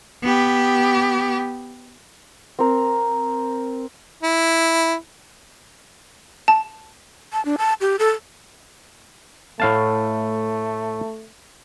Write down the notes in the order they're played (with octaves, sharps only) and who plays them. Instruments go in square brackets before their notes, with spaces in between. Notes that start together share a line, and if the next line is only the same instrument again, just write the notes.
[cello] B3 G4
[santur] C4 A#4
[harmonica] E4
[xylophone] A5
[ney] A5
D4
A5
G4
A4
[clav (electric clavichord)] A2 F5 A5 [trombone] A3